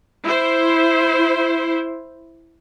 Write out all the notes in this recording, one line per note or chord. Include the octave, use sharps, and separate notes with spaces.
E4 C5